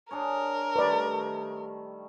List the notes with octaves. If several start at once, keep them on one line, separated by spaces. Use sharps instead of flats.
D4 G#4 A#4 C#5
D#3 G3 A3 B4 D5